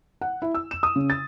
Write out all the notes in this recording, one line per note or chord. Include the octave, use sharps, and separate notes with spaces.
F#5
E4
E6
E7
D#6
C#3
A6